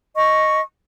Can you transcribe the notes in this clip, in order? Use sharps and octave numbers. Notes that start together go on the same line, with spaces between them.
D#5 C#6